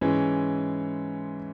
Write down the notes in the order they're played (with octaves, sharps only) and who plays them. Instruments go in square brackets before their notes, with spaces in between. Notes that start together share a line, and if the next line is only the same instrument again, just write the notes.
[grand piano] G#2 E3 G#3 C#4